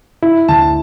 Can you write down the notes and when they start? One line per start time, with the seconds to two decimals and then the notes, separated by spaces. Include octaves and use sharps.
0.23 E4
0.48 D2 A5